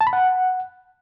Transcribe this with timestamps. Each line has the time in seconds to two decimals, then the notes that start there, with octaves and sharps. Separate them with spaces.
0.01 A5
0.07 B5
0.13 F#5